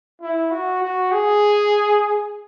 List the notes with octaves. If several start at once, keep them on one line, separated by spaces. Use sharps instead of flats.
E4
F#4
F#4
G#4